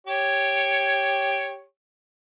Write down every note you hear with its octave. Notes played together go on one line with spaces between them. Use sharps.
G4 C#5